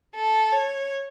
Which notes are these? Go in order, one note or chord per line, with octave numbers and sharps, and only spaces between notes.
A4
C#5